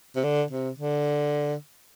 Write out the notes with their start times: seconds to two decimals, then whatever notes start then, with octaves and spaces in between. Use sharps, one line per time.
0.16 C3
0.24 D3
0.51 C3
0.79 D3